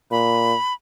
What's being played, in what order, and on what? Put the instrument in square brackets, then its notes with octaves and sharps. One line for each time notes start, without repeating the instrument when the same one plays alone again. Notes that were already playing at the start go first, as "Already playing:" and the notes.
[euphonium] A#2 [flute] B5